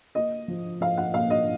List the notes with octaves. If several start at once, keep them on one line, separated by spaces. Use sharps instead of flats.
A#3 D#5
F3
F3 F5
F#5
A#2 F5
D#5